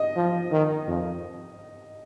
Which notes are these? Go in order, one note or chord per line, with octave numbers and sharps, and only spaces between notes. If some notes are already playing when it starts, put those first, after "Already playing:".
Already playing: D#5
F3
D#3
F2